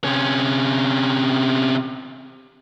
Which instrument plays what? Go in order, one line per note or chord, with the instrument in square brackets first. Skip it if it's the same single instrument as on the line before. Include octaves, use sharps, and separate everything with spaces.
[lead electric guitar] C3 C#4